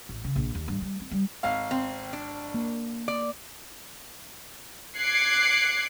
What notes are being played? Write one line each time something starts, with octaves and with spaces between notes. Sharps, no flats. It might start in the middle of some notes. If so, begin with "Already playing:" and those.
A1
C#3
A#1
D#2
G2
G3
C4
G3
G#1 F5
C4
D4
A#3
D5
D6 F#6 G#6 C7 C#7